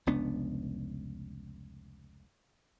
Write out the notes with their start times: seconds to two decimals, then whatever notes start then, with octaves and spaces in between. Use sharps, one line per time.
0.07 F1 C#2 B3 D4